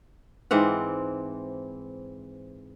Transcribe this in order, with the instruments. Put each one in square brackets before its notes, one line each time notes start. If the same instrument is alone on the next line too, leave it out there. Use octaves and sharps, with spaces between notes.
[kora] G#2 E3 C4 F#5